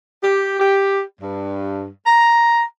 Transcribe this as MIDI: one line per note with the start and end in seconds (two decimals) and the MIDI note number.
0.23 0.55 67
0.60 1.03 67
1.21 1.87 43
2.07 2.63 82